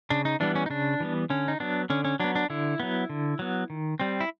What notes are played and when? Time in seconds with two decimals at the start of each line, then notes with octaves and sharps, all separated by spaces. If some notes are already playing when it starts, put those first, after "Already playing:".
0.10 C#3 D4
0.25 D#4
0.40 E3 G3 B3 D4
0.55 C#4
0.66 D#4
0.70 C#3 D4
1.00 E3 G3 B3
1.30 D3 C#4
1.48 D#4
1.60 F#3 B3 D4
1.90 D3 C#4
2.05 C#4
2.20 F#3 B3 D4
2.35 D4
2.50 D3 E4
2.80 F#3 B3
3.10 D3
3.39 F#3 B3
3.70 D#3
4.00 G3 C4
4.21 E4